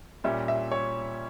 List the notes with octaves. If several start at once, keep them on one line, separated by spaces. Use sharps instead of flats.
A#2 G3 C#4 E5
E5
C#5